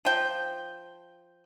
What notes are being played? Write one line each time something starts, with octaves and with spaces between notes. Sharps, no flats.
F3 G5